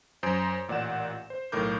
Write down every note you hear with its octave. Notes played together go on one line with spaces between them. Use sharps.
F#2 C5 G#5 D#6 G6 D7
A1 A#2 D5 F#5 E7
C5
B1 A2 A#4 D6 G6